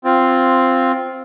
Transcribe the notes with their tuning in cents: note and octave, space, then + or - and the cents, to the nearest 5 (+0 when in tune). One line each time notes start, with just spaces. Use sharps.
C4 +0 F4 +0